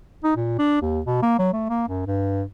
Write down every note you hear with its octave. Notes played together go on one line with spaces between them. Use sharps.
D#4
A#2
D4
D#2
B2
A#3
F#3
A3
A#3
F#2
G2